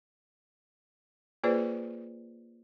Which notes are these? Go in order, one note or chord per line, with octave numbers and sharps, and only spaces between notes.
A#3 F4 G#4 B4 C5 D5